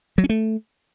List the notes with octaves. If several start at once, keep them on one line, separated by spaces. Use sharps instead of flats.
F#3
C#4
A3